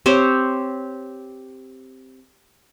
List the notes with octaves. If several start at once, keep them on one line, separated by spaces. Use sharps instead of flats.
C4 G4 C5 C#5